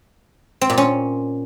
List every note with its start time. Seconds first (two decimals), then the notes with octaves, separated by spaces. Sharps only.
0.61 C4
0.70 A#2
0.78 C#4